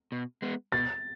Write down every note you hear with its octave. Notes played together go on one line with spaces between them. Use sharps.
B2
G#3 B3
B2 A6